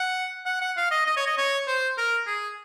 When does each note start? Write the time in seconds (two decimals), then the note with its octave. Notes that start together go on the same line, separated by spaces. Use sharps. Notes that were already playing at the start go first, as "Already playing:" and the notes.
Already playing: F#5
0.46 F#5
0.61 F#5
0.77 F5
0.91 D#5
1.06 D#5
1.17 C#5
1.27 D#5
1.37 C#5
1.67 C5
1.98 A#4
2.27 G#4